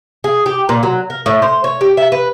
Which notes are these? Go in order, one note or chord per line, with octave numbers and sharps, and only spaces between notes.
G#4
G4
A#2
F#3
A#4
A2
C5
C#5
G4
E5
B4